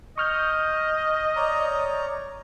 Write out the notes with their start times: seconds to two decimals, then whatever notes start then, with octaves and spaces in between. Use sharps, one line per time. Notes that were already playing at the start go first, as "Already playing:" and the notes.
0.18 D#5 C#6 F6 G6
1.36 C#5 D5 A#5